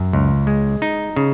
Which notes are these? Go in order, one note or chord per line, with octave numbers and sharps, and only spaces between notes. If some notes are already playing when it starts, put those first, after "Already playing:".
Already playing: F#2
C#2
G#3
D#4
C#3